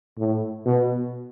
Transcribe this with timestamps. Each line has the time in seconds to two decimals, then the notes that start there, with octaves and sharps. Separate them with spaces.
0.18 A2
0.66 B2